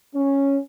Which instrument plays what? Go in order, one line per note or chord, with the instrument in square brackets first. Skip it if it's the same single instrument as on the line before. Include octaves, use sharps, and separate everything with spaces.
[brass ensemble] C#4